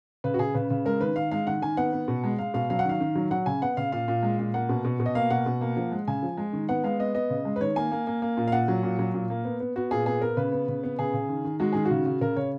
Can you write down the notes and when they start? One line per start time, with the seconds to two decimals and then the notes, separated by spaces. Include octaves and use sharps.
0.24 C#3 B4
0.34 F#4
0.39 C#3 G#4
0.54 C#3 B4
0.70 C#3
0.85 G#3 A#4
1.00 D#3 B4
1.16 D#3 F5
1.31 G#3 F5
1.47 D#3 F#5
1.62 D#3 G#5
1.77 B3 F#5
1.93 B3
2.08 B2
2.24 G#3
2.39 G#3 F5
2.54 B2 F5
2.70 F#3 F5
2.79 F#5
2.85 D#3 F5
3.00 D#3
3.15 F#3
3.31 F#3 F#5
3.46 C#3 G#5
3.62 B3 F#5
3.77 C#3 F5
3.92 A#2 F5
4.08 A#2
4.23 G#3
4.39 A#2
4.54 A#3 F#5
4.69 B2
4.85 B2
5.00 B2
5.06 D#5
5.15 A#3 F5
5.30 B2 F#5
5.46 B2
5.61 A#3
5.77 F3
5.92 G#3
6.07 C#3 G#5
6.23 F3
6.37 G#3
6.53 D#3
6.69 B3 F#5
6.84 G#3 F5
6.99 B3 D#5
7.15 B3 D#5
7.30 C#3
7.45 G#3
7.56 B4
7.61 D#3 C#5
7.76 A#3 G#5
7.91 A#3
8.07 A#3
8.22 A#3
8.37 A#2
8.48 F5
8.52 A#2 F#5
8.68 F#3
8.83 A#2
8.99 F#3
9.14 A#2
9.30 A#3
9.45 B3
9.60 B3
9.76 B3 F#4
9.91 A#2 G#4
10.06 B3 G#4
10.21 B3 A#4
10.37 C#3 B4
10.52 B3
10.68 C#3
10.84 B3
10.99 C#3 G#4
11.14 C#3
11.29 D#3
11.44 D#3
11.60 G#3 F#4
11.73 D#3 G#4
11.85 F#4
11.91 C#3
12.06 C#3
12.21 C#3 A#4
12.36 C#3 C#5